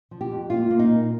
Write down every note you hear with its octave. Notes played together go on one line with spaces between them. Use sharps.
F3
G4
F2
A#3 F4
A#3
D#4
A#2